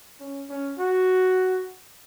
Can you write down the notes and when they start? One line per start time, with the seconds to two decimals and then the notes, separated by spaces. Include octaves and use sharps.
0.20 C#4
0.50 C#4
0.78 F#4